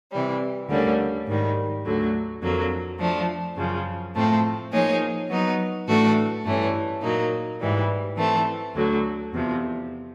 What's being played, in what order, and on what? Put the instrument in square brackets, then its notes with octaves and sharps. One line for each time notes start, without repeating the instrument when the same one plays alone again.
[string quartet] C3 E3 G3
D2 D3 G3 A#3 C#4
G#2 D#3 G3
D2 D3 F#3
F2 D3 F#3 A#3
F3 A3 D4
F#2 C#3 F3
A2 F3 A3 C4
F3 A#3 D#4 G#4 C#5
F#3 B3 D#4
A2 E3 A3 D4 F#4
G2 E3 A3 C#4
A#2 F#3 A#3 D#4
G#2 E3 G3
E3 A3 C4
D2 D3 F#3
E2 C3 F3